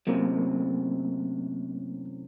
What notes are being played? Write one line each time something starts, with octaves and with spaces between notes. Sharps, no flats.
F#2 A2 C3 F#3 A#3